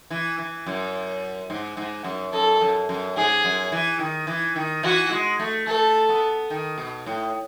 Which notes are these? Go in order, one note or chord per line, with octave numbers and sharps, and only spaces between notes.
E3
E3
F#2
G#2
G#2
F#2
F#2 A4
F#2
F#2
G#2 G#4
F#2
E3
D#3
E3
D#3
E3 F#4
G#3
A3
A3 A4
B3
D#3
B2
A2